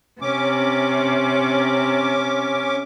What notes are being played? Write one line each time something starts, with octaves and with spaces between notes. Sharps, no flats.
C3 C#4 D6